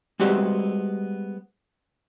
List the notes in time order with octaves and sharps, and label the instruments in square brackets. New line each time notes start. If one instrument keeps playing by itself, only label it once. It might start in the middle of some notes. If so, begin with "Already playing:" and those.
[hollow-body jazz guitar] G3 G#3 B3 C4 F#4 G4